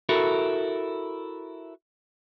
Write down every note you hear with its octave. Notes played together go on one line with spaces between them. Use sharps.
E4 F#4 A4 A#4